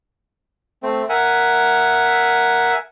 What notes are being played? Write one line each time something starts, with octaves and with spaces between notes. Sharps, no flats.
A3 C4
A#4 E5 F#5 G#5